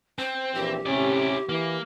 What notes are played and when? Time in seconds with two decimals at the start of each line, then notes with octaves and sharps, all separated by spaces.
0.18 C4 C5
0.55 A#1 E3 G4
0.86 A2 C3 C#4 E4 D5
1.49 E3 A#3